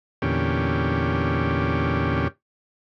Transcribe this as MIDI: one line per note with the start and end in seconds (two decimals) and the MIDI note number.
0.22 2.28 40
0.22 2.28 46
0.22 2.28 50
0.22 2.28 61
0.22 2.28 67